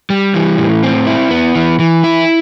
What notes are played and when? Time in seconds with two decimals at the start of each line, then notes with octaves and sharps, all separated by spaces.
0.10 G3
0.34 E3
0.58 A2
0.83 C4
1.07 E4
1.31 B3
1.55 E3
1.79 E3
2.04 E4